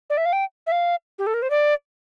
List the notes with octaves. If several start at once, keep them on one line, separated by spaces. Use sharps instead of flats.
D5
E5
F5
G5
E5
F5
G4
A4
A#4
C5
D5